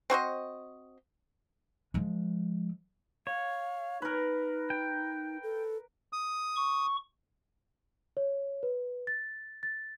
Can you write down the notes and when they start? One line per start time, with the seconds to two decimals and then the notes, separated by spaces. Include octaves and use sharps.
0.10 C4 F#4 C5 D#5
1.94 F3 G#3
3.27 C#5 F5
4.02 D#4 A#4 B4
4.70 G5
5.43 A4
6.13 D#6
6.56 C#6
8.17 C#5
8.63 B4
9.07 A6
9.63 A6